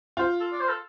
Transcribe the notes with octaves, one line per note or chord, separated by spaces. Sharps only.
F4 C5
A4
D5
C5
A4